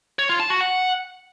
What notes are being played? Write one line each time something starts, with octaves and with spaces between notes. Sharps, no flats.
C#5
F4
A5
F#4
F#5